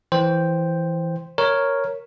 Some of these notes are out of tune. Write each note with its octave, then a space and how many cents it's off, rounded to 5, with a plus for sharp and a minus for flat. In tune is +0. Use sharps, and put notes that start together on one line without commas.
E3 +0 C5 +0 G5 +0
A#4 +0 C#5 +0